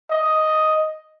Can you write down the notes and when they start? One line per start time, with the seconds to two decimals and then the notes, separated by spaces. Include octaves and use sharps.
0.10 D#5